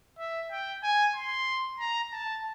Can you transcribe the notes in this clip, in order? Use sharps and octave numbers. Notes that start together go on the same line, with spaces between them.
E5
G5
G#5
C6
A#5
A5